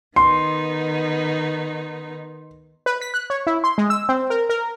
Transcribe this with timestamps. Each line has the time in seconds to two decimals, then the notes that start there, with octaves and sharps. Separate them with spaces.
0.16 D#3 B3 D#4 C6
2.86 B4
3.02 B6
3.14 F#6
3.30 C#5
3.47 E4
3.64 C6
3.78 G#3
3.90 E6
4.09 C4
4.30 A#4
4.49 A#4